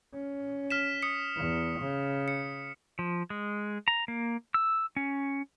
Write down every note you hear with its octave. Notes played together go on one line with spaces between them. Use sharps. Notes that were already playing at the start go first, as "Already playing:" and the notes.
C#4
F6 B6 E7
D#6 C#7
E2
C#3
C#7
F3
G#3
A#5
A#3
E6
C#4